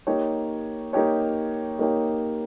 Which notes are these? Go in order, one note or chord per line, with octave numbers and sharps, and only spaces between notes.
A#3 D#4 G4 C#5
A#3 D#4 G4 C#5
A#3 D#4 G4 C#5